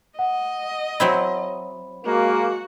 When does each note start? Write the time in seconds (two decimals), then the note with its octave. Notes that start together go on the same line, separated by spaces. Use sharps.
0.19 D#5 F#5
1.00 F#3 C4 E4 B5
2.05 G#3 A#3 F#4